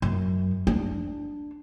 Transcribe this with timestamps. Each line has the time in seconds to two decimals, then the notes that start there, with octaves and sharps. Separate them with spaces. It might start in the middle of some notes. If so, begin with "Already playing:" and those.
0.02 F#2
0.67 D4